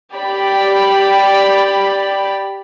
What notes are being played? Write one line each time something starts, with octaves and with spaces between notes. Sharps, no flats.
G4 D5 B5